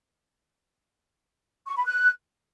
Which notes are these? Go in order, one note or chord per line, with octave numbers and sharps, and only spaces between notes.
C#6
B5
F#6